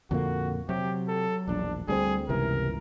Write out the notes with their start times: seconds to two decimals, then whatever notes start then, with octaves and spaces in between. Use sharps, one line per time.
0.11 F2 A#2 D3 A#3 F#4
0.69 C3 F#3 G4
1.08 A4
1.48 E1 A#1 D4
1.88 D2 C3 G3 C4 G#4
2.29 G1 C#2 C3 E3 A#4